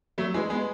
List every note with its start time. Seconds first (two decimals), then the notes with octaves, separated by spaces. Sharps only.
0.18 F#3 A3
0.34 E3 G#3
0.50 G#3 B3